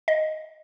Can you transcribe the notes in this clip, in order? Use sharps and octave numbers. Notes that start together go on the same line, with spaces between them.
D#5